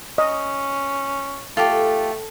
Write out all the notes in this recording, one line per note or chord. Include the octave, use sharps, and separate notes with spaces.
C#4 D#5
A3 F4 G4 A4